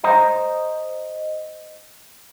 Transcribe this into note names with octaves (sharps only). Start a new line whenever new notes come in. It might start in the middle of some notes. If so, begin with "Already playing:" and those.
C5 D#5 A#5